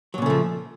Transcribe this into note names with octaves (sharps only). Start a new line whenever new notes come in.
A#2 C#3 F3 F#3 A3